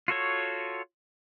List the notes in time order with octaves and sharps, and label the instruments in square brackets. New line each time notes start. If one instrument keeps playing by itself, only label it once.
[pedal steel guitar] F4 F#4 A4 C#5